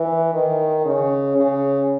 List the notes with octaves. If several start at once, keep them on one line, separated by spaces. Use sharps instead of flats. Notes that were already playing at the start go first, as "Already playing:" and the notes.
Already playing: E3
D#3
C#3
C#3